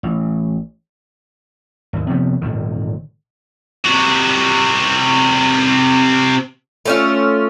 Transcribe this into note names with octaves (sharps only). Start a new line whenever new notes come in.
A1
G#1 D#2
C3 F3 B3
G#1 A#2 D3 D#3
C3 F#4
A3 C#4 F4